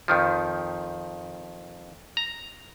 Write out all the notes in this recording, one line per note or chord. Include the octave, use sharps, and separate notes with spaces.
F2 D#3 F3
A#5